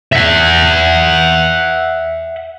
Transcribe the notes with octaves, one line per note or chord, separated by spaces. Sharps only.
E5 F#5